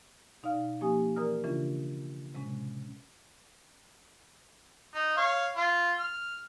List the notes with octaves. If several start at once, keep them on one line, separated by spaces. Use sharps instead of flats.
B2 D#4 D5 F5 F6
F3 A#3 C#4 G4 G#5 D#6
E3 A#4 D5 A#5 D#6 F6
C#3 E3 C#4 D4 E4 F4
A2 C3 G#3 C#4
D#4
C#5 F5
F4
F6